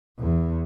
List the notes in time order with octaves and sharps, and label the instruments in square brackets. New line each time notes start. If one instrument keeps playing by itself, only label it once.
[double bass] E2